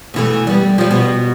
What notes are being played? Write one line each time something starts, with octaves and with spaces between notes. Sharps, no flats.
B2 E3 A3
G3 B3
F3 G3
B2